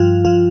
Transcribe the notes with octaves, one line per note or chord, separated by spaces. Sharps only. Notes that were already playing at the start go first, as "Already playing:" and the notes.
Already playing: G2 F3 F4
G2 F3 F4